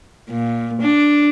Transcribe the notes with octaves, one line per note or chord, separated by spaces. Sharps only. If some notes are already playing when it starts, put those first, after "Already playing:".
A#2
D4